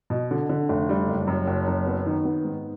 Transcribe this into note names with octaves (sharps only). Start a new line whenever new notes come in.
B2
D3
D3
F1
G3
F#1
F#2
F#1
F#2
B3
D#3
B3
G#2